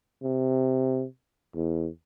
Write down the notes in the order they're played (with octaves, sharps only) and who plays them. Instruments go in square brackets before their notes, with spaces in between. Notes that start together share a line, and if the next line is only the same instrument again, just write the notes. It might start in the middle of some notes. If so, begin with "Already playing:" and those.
[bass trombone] C3
E2